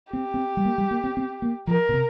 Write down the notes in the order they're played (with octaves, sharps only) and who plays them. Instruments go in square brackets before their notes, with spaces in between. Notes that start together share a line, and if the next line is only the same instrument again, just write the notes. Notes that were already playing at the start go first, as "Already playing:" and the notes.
[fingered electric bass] C4 [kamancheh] G4
[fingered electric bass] C4
G3
A#3
G3
A#3
C4
C4
A#3
[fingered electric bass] F3 [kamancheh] A#4
[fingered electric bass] A#2
C3